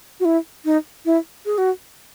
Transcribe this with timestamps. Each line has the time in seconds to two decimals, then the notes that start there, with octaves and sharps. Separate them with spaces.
0.20 F#4
0.25 E4
0.65 D#4
1.05 E4
1.46 G#4
1.58 F#4